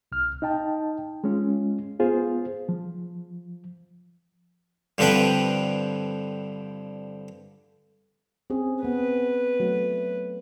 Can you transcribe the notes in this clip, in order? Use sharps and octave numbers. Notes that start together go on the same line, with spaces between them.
C2 F6
D#4 D#5 G5 A5
G#3 C#4 F4
B3 F4 G#4 C5
F3
G2 D3 F3 C4 B4 G5
C4 C#4 G#4
B3 C4 B4
F#3 A3